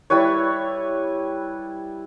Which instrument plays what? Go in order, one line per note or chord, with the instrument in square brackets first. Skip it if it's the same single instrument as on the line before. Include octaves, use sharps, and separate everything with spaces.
[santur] G3 E4 B4 C#5